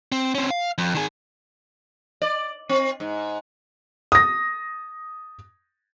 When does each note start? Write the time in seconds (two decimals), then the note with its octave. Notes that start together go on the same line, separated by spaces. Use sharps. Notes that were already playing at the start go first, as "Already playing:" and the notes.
0.12 C4
0.35 C4 C#4
0.50 F5
0.78 F2
0.95 D#3 G#4
2.22 D5
2.69 C4
3.00 G#2
4.12 D#6 A#6